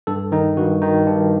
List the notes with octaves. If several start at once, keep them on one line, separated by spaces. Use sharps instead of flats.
G2 A4
D#3 D#4
G2 F#4
D#3 D#4
G2 D4